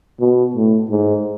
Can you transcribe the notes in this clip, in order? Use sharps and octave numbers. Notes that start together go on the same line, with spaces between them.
B2
A2
G#2